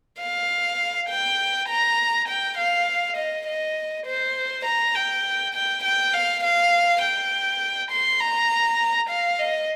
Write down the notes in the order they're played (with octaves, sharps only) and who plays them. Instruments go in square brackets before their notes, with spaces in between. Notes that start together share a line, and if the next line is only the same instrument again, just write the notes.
[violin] F5
G5
A#5
G5
F5
D#5
D#5
C5
A#5
G5
G5
G5
F5
F5
G5
C6
A#5
F5
D#5